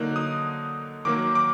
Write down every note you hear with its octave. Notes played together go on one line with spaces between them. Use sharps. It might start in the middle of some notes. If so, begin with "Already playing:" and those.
Already playing: D3 F#3 A#3 D#4 F#6
D#6
D#3 F#3 A#3 D6
D6